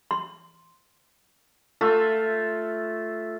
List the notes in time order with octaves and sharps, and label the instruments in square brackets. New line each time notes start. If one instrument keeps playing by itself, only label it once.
[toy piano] C6
[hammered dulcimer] A3 F4 E5